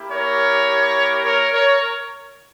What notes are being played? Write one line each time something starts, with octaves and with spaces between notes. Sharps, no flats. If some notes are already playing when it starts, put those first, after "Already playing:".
Already playing: A#3 E4 G4
A#4 C#5
A#4 C#5
A#4 C#5